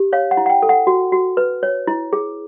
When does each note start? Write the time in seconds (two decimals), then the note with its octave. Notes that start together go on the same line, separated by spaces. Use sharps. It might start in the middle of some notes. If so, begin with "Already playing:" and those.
Already playing: G4
0.13 C#5 F5
0.31 F#5
0.37 E4
0.46 F#5
0.50 G5
0.62 A4
0.69 F#5
0.87 F#4
1.12 F#4
1.37 B4
1.63 C#5
1.87 E4
2.13 G#4